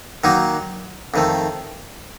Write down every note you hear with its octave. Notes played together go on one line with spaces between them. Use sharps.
D#3 F#3 A#3 D#4
F2 D#3 A3